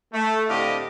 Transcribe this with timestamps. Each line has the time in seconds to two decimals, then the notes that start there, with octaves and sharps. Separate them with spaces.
0.13 A3
0.49 A2 D3 C4 G4 D#5 F5